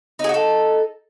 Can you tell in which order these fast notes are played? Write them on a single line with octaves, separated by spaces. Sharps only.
D#4 G#4 F#4 A4